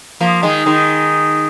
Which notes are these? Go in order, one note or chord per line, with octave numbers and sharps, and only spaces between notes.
F3 A#3
D#3 G#3
D#3 G#3